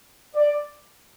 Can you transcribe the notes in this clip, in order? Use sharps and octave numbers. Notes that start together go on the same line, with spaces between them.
D5